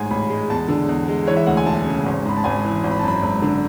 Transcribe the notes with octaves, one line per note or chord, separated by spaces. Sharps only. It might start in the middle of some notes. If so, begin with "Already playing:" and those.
Already playing: A1 G#2 F#5 G#5
A1 B5
G#3
E2 A5
D3
E2
G#3
E3 C#5
E5
D2 F#5
G#5
E1 A5
C#3
G#1
G#2 B5
A5
G#1 G#5
E3
G#1
B5
A5
F#2
B5
G#1
D3